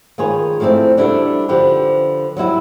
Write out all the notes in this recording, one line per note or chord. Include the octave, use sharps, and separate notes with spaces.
D#3 F4 G#4 B4 C#5
F3 A3 C4 E4 D5
G3 D4 E4 F#4 G4 A4
D3 F3 G4 B4
F#3 G3 E4 F#4